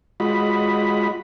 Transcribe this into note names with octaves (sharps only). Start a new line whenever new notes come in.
G#3 F4 F#4 D#5 B5